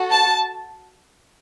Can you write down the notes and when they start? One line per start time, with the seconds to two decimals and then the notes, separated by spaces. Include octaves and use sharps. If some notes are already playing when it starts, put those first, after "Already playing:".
Already playing: F#4 A4
0.11 A5